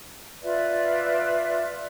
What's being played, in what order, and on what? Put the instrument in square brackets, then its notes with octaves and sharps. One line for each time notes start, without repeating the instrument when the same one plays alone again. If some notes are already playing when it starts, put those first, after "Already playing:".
[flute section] F4 B4 D5 E5